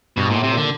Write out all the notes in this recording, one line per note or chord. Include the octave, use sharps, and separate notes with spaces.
G2 B2
G#2
A#2
A2
C3
A#2 D3